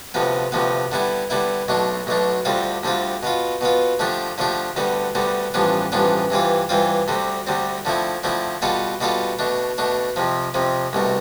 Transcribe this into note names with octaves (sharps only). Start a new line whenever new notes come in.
D2 C3 F3 B3
D2 C3 F3 B3
D3 G3 B3 E4
D3 G3 B3 E4
B1 B2 A3 D4
B1 B2 A3 D4
D2 D3 G3 C4 F4
D2 D3 G3 C4 F4
B2 B3 F4
B2 B3 F4
D3 F3 A3 D4 G4
D3 F3 A3 D4 G4
D2 D3 G3 B3
D2 D3 G3 B3
A1 G2 F3 B3 D4
A1 G2 F3 B3 D4
G2 E3 G3 C4 F4
G2 E3 G3 C4 F4
D2 D3 G3 C4
D2 D3 G3 C4
D3 F3 A3 C4 E4
D3 F3 A3 C4 E4
B2 G3 B3 F4 A4
B2 G3 B3 F4 A4
B2 A3 D4
B2 A3 D4
F2 C3 F3
F2 C3 F3
C2 B2 A3